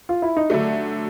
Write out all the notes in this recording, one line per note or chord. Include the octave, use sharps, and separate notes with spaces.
F4
E4
D#4
D3 F#3 A3 D4